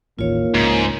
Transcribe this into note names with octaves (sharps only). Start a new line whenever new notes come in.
A1 D#2 A#3 F4 C#5
C#2 G#2